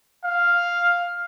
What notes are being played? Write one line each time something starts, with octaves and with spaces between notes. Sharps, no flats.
F5